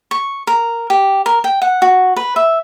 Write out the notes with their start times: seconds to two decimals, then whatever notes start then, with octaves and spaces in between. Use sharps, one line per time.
0.11 C#6
0.47 A#4
0.90 G4
1.26 A#4
1.44 G5
1.62 F#5
1.82 F#4
2.16 B4
2.36 E5